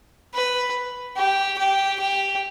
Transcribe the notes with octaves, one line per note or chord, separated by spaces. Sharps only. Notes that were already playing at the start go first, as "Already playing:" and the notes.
B4
G4
G4
G4